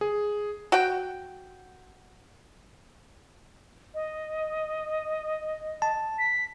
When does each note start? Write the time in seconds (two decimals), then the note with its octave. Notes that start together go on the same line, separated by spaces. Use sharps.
0.01 G#4
0.72 F#4 G5
3.94 D#5
5.82 A5
6.19 B6